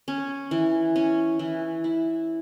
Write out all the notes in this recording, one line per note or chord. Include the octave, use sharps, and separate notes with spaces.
C#4
E3
C#4
E3
E4